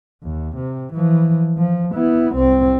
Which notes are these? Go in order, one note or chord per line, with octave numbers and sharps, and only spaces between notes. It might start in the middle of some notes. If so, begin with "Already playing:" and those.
D#2
C3
E3 F3
F3
B3 E4
C2 C4